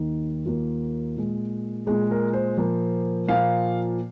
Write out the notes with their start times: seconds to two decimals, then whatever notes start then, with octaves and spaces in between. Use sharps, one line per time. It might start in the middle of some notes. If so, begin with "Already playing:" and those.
Already playing: D#2 D#3 A#3 D#4
0.46 D#2 D#3 A#3 F4
1.17 A#2 G#3
1.86 A#2 G#3 G#4
2.11 A#4
2.33 C5
2.57 A#2 F3 A#3
3.27 A#2 F3 A#3 F5